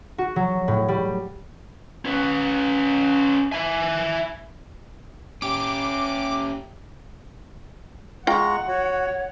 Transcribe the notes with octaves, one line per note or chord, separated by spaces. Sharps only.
F#4
F#3
A2
G3
C#4 B4
E4 G#5
C#4 G4 D6
G#3 F4 F#5 G5 A#5 C#6
F#4 C#5